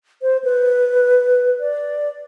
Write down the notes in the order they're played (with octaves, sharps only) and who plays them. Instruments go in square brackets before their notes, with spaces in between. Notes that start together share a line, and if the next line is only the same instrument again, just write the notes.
[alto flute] C5
B4
D5